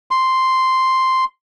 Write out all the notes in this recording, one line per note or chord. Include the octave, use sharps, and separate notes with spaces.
C6